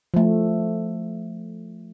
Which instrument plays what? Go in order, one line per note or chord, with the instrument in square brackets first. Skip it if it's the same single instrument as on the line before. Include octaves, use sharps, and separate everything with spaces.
[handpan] F3 A3